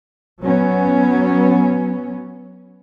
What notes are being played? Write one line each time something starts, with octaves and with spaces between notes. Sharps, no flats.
F#3 B3 C#4